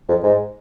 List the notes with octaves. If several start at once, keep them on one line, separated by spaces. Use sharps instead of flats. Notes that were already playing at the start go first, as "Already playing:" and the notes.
F2
G#2